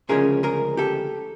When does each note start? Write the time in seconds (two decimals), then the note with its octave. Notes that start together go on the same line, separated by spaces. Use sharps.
0.09 D2 C#3 F3 G#3 C#4 G#4 A#4
0.43 G#4 A#4
0.77 G4 A4